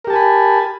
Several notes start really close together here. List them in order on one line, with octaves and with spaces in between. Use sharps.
A#4 G4 A5 G#5 B5